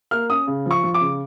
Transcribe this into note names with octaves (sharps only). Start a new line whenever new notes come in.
A#3 F6
C#4 D#6
C#3
F3 C#6
F3
D6
C#3